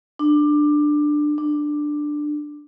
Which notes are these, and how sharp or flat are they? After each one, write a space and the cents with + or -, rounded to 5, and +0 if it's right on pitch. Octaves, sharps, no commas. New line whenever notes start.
D4 +15
D4 +10